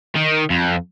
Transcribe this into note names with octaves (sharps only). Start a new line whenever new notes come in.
D#3
F2